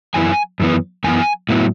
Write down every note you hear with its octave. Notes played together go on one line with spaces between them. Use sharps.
F#2 E3 B3 E4 G#5
F#2 E3 B3
F#2 E3 B3 G#5
A2 F#3 B3 E4